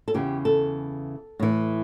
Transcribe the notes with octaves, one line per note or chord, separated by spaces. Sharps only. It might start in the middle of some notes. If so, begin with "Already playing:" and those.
A4
E2 C#3 E3 G4
A4
A2 E3